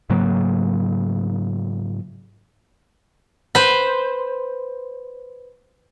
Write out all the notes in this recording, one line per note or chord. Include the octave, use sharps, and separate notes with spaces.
G#2 C#3 F#3 A#3
B4 C5